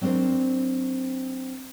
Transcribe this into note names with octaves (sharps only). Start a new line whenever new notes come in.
F#3 C4 D4 A#4 C5